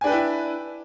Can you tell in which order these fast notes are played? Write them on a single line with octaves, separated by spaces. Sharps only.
G#5 D4 B4 G5 E4